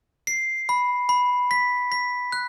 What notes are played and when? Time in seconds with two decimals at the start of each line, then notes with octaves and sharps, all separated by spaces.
0.27 C7
0.69 B5
1.09 B5
1.51 B6
1.92 B6
2.32 F#6